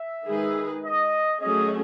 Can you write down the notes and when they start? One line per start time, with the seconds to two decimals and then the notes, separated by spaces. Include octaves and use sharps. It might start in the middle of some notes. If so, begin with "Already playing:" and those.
Already playing: E5
0.24 D#3 G#3 D#4 G#4 B4
0.83 D#5
1.41 F#3 A3 C#4 G#4 D#5